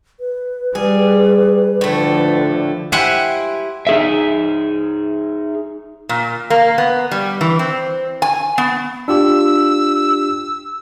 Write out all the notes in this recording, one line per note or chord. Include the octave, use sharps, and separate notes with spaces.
B4
G3 G#4
A2 D3 F3 A3
E4 G4 C5 F#5 G#5
D#4 G#4 E5
A#2
A#3
B3
G3
E3
C4
G#5
B3
D4 F4 G4 E6